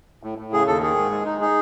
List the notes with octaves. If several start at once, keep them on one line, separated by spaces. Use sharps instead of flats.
A2
A2
C#3 G#4
D#2 A4
D#3 G#4
G#2
G#3
D#4
D#4 G#4